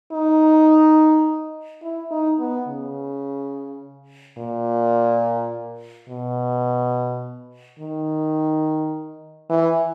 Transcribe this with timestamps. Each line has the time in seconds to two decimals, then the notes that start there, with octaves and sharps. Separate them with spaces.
0.12 D#4
1.83 E4
2.11 D#4
2.39 B3
2.68 C#3
4.38 A#2
6.09 B2
7.79 D#3
9.50 E3